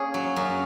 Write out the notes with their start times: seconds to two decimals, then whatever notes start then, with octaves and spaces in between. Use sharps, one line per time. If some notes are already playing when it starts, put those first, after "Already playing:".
Already playing: A#3 C#4 G#4
0.14 F#3
0.36 F#2